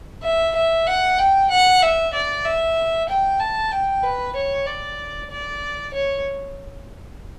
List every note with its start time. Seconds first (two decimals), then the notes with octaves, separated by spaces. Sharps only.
0.23 E5
0.55 E5
0.87 F#5
1.19 G5
1.51 F#5
1.82 E5
2.14 D5
2.45 E5
3.09 G5
3.40 A5
3.72 G5
4.03 B4
4.36 C#5
4.66 D5
5.31 D5
5.93 C#5